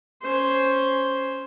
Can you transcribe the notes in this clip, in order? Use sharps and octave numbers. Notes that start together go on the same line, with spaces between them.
C#4 C5